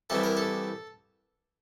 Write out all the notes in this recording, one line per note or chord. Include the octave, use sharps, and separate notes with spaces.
C2 C3 E3 G3 A4
A#4
A4